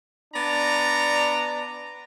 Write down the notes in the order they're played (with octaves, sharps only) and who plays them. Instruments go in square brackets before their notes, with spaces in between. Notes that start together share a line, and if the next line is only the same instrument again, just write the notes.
[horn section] B3 D4 D5 A#5